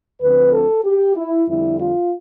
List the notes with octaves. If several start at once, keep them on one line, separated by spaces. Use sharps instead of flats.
D2 D3 F3 C4 B4
A4
G4
E4
F2 D3 G3 E4
F4